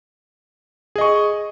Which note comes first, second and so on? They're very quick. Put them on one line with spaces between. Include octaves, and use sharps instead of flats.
G#4 D#5 C#6